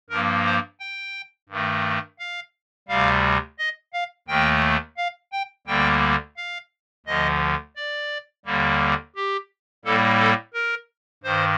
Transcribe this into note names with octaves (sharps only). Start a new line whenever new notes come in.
G2 F3 A#3 A#4
C5
G5
G2 D#3 A3
F5
D2 C3 G3 F5
D#5
F5
D#2 D#3 A3 G5
F5
G5
D2 D3 G3 A#3 G5
F5
D2 D3 F3 D#5
D5
D#2 D3 G3 A#3
G4
A2 G3 A#3 A4
A4
A#4
G2 D#3 C5